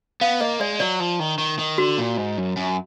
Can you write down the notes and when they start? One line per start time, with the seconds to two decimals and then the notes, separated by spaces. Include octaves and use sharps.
0.21 B3 F5
0.40 A#3 D#5
0.60 G#3 D5
0.80 F#3 D5
1.00 F3
1.20 D#3
1.38 D#3
1.59 D#3
1.78 D3 F#4
1.98 A#2
2.17 G#2
2.37 F#2
2.57 F#2